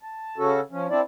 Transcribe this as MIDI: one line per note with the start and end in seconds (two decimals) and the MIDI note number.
0.03 0.38 81
0.38 0.60 49
0.38 0.60 61
0.38 0.60 66
0.38 0.60 69
0.71 0.87 53
0.71 0.87 61
0.90 1.01 60
0.90 1.01 62
0.90 1.01 64
0.90 1.01 74